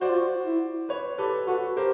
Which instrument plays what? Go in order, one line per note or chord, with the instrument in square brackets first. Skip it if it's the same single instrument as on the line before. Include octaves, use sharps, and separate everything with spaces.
[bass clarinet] F#4 [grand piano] C5 D5
[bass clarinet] F4
F#4
E4
[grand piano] B4 C#5
[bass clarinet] G4 [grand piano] A4 B4
[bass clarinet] F#4 [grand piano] A4 B4
[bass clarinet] G4 [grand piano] A#4 C5